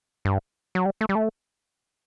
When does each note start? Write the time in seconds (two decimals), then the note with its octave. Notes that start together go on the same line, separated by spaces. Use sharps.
0.25 G2
0.75 F#3
0.85 G3
1.01 A3
1.09 G3
1.15 A3